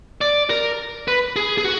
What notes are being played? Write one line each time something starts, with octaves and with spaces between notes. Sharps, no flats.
D5
A#4
B4
G#4
G#4
F#4